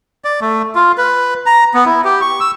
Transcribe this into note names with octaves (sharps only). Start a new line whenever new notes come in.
D5
A3
F4
B4
A#5
B3
E4
G4
C#6
E6